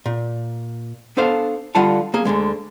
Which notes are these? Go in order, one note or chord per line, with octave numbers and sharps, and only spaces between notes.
A#2
B3 D4 A4 C5 F5
D3 G3 F4 F5 F#5 A5
A#3 G#4
D2 B2 D3 G#3